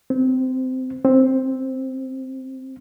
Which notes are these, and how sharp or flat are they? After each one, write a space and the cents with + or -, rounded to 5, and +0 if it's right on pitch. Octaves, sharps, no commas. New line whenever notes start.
C4 -20
C4 +5